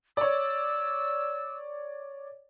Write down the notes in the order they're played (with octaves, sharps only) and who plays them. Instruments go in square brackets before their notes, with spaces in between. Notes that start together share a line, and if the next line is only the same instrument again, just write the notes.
[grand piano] C#5 D5 [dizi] E6